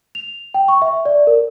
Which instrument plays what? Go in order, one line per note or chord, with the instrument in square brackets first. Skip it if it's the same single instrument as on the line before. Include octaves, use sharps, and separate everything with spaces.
[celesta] F7
G5
C#6
E5
D5
A#4